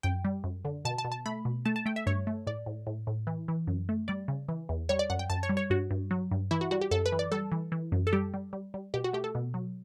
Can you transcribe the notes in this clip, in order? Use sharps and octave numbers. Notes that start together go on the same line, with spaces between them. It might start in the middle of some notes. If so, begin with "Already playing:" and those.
F#2 G5
G3
F#2
D3
B2 A5
A5
B2
A5
A3 B5
B2
A3 A5
A5
A3 G5
E5
G2 C#5
A3
A2 D5
A2
A2
A2
E3
E3
F#2
A3
G3 D5
C#3
E3
E2
G3 C#5
D5
F#2 F#5
G5
F#2 A5
C#5
G3
C#5
G2 F#4
G2
F#3
G2
E3 E4
F#4
G3 F#4
G4
F#2 A4
B4
E3
D5
G3 A4
E3
E3
F#2
A4
G3 G4
G3
G3
G3
B2 G4
F#4
A3 G4
A4
B2
F#3